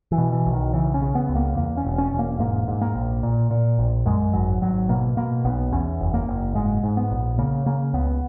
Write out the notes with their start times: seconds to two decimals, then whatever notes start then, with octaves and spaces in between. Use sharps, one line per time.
0.12 E3
0.18 B2
0.32 E3
0.46 B1
0.53 D#3
0.73 C#3 E3
0.94 C#4
1.02 C#3
1.15 B3
1.29 C#2
1.36 A#3
1.57 E2 A#3
1.77 C#4
1.85 E1
1.98 C#4
2.12 E1
2.19 A#3
2.39 G#2 A#3
2.68 G#2
2.81 A#3
2.95 A#1
3.23 A#2
3.51 A#2
3.79 A#1
4.06 F#2 G#3
4.33 G#1 F#3
4.61 G#1 F#3
4.89 B2 A#3
5.17 B2 A#3
5.45 B1 B3
5.72 E2 C#4
6.00 F#1
6.14 A#3
6.27 F#1
6.55 G#2 G#3
6.83 G#2
6.97 B3
7.11 A#1
7.39 C#3 A#3
7.66 C#3 A#3
7.93 C#2 B3